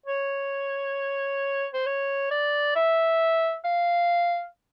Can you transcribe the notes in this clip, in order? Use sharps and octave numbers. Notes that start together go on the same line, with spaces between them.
C#5
C5
C#5
D5
E5
F5